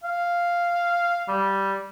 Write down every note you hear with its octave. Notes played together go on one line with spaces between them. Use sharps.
F5
G3